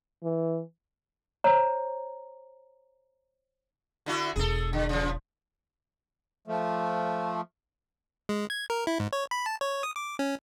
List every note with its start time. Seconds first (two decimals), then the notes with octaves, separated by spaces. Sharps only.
0.23 E3
1.44 C5 C#5 A#5
4.06 D3 E4 F#4
4.36 E1 D4 G#4 A4
4.73 D3
4.89 C#3 F3
6.47 F3 A3
8.29 G#3
8.50 G#6
8.70 A#4
8.87 E4
9.00 G#2
9.13 C#5
9.31 B5
9.46 A5
9.61 C#5
9.83 D#6
9.96 D6
10.19 C#4